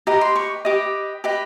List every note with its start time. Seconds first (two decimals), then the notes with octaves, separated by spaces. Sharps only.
0.07 G4 B4 D#5 A#5
0.21 C6
0.36 C#6
0.65 G4 B4 D#5 D6
1.24 G4 B4 D#5